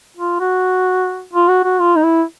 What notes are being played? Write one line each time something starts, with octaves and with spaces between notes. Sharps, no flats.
F4
F#4
F4
F#4
F#4
F4
D#4
E4